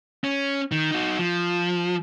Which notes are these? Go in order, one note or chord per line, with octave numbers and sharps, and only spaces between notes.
C#4
D#3
D#4 F#4
F3